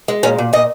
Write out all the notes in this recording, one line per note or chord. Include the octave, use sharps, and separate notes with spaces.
G#3
A#2 C#4
A#2
A#2 D#5